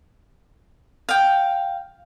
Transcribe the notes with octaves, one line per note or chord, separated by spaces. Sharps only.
F5 G5